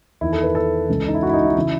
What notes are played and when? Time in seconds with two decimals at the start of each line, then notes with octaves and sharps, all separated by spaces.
0.21 E2 D#3 E4
0.33 A4
0.43 B4
0.55 A4
0.88 C#2 C#3 E3
1.08 D#4
1.15 E4
1.23 F#4
1.29 E4
1.33 D#4
1.45 E4
1.57 C#3 E3 E4